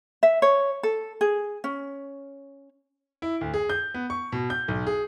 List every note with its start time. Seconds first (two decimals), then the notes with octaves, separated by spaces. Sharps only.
0.23 E5
0.42 C#5
0.83 A4
1.21 G#4
1.64 C#4
3.22 E4
3.41 D2
3.54 G#4
3.69 G6
3.94 B3
4.10 C#6
4.32 B2
4.50 G6
4.68 B1
4.87 G#4